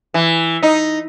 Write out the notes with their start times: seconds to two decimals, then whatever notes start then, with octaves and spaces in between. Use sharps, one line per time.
0.14 E3
0.63 D#4